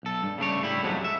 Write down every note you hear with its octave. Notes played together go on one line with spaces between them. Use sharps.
B1 A4
G2
C#3 A3 D4 C#5
A2 G3 E4
F2 C3 F#3 G#3 A3
E5